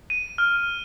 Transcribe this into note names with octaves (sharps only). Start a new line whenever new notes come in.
D#7
F6